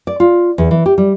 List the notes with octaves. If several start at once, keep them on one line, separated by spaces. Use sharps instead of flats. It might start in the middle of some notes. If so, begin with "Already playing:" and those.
D5
F4
E2
E3
G4
G3